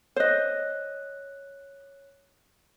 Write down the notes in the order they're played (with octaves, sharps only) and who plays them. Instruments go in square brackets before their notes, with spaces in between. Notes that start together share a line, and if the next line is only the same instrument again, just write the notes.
[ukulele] C5 D#5 [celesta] C#5 F#6